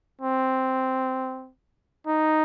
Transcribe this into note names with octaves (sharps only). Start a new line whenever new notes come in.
C4
D#4